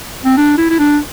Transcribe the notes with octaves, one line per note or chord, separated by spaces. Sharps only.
C4
D4
E4
E4
D4